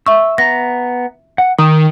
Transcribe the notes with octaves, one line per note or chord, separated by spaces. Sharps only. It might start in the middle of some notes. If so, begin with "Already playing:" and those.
E5 C#6 E6
B3 A#5 A#6
F#5
D#3 G5 D#6